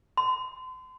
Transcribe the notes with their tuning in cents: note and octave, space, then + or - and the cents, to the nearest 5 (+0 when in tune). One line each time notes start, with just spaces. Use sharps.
C6 -40